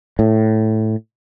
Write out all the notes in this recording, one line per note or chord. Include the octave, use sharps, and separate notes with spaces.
A2